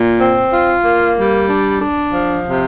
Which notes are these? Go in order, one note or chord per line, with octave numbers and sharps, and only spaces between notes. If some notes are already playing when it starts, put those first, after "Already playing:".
Already playing: A#2
C4
F4
A#3
G3
D4
D4
F3
C3